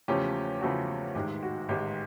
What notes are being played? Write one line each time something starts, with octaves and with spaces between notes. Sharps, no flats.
E2 C#3 F3 A3 C#4 G4
E2 C#3 F3 A3 C#4 F#4
A1 G#2 D#3 G#3 G4
F#4
A1 G#2 D#3 G#3 G4